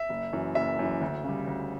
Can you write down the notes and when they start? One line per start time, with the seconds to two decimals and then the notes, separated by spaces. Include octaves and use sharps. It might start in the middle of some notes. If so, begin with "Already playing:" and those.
Already playing: E5
0.09 F#1
0.33 F#2 E3
0.55 F#1 E5
0.79 F#2 E3
1.01 D2
1.24 C#3 G3
1.47 D2